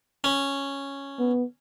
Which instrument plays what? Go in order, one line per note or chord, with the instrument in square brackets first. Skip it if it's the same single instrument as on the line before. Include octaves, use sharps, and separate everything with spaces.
[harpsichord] C#4
[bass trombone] B3